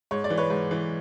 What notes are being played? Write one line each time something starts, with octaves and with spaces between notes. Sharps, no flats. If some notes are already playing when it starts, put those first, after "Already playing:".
G#2 C#5
D5
E3
B4 C#5
G#2
E3